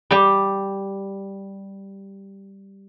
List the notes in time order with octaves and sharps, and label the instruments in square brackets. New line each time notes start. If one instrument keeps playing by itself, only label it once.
[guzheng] G3 G4